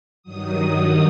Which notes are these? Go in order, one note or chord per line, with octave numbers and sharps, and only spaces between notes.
G2 D#3 F#3 D#6